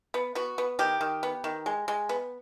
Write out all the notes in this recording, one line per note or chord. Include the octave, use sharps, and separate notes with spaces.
B3
B3 F#4
B3
D#3 G4
D#3
B3
D#3
G#3
G#3
B3